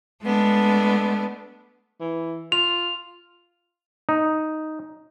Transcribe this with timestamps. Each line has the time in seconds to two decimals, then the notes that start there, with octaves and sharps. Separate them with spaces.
0.22 G#3 A3 B3 D4
2.01 E3
2.52 F4 F7
4.09 D#4